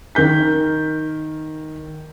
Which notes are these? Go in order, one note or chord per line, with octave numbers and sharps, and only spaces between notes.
D#3 A#4 G6 B6